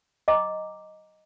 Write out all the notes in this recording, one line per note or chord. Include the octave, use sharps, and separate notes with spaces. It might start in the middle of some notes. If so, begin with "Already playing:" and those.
D#5 G5 A#5 D6